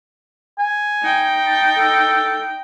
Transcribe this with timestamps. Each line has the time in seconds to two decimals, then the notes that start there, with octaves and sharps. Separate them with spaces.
0.59 G#5
1.02 D#4 G5
1.47 A5
1.77 A4